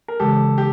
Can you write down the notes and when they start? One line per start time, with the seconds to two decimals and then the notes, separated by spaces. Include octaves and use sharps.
0.08 A#4
0.20 C#3 E3 G#3 G4 A4
0.58 G4